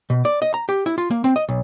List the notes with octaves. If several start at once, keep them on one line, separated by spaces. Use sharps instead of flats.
B2
D5
D#5
A#5
G4
E4
F4
A#3
C4
D#5
B1